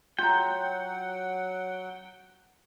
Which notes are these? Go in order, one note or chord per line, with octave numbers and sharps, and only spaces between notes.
F#3 F4 F#5 G5 A#5